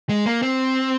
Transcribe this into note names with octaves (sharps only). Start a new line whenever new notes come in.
G#3
A#3
C4